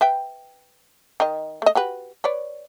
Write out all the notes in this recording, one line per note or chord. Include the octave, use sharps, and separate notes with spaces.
B4 E5 G5
D#3 D#5
A3 D#5
F#4 G4 B4
B4 C#5 D5